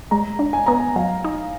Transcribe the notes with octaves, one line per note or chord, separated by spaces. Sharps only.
G#3 A#5
D4
G#5
B3 A#5
G#5
F#3 F5
D#4